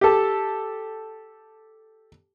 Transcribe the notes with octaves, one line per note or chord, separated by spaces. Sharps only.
G4 A4